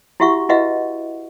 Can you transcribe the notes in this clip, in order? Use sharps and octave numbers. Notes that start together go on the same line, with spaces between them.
E4 F#4 G4 E5 F#5 C#6
E4 F#4 B4 D#5 E5 F#5